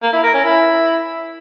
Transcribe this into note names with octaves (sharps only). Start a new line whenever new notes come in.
A#3
E4
A#4
C#4
E4